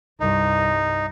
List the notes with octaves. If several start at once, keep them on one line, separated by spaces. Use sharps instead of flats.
C2 G2 D#4